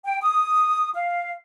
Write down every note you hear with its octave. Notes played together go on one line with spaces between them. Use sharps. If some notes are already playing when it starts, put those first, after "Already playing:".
G5
D#6
F5